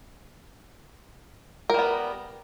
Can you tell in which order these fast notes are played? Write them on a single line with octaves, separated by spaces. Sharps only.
A#4 G3 B3